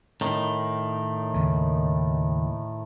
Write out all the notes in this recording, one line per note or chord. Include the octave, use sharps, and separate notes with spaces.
A2 D#3
D#2 C#3